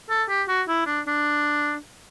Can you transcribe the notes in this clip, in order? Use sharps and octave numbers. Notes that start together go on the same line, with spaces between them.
A4
G4
F#4
E4
D4
D4